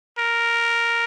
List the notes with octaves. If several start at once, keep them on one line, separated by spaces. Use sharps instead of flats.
A#4